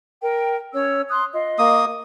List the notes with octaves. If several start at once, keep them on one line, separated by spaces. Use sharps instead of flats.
A#4 G5
C#4 C#5 E6
C6 D#6 F#6
F4 D#5
A#3 D#6